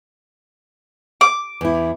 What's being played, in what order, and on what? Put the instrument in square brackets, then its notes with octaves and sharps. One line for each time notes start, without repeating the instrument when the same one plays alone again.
[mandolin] D6
[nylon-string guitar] E2 E4